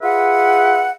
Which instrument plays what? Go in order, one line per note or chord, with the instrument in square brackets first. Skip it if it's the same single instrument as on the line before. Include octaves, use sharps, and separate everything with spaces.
[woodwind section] F4 G#4 B4 E5 F#5